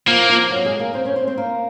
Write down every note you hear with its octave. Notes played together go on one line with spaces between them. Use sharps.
F3 A#3 F4
F3 F4
F4
F#3 F#4
G#3 G#4
A#3 A#4
C4 C5
C#4 C#5
C4 C5
C4 C5
A#3 A#4